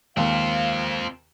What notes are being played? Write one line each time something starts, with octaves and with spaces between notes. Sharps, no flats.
D#2 G#3 A#3 C4 F4 F5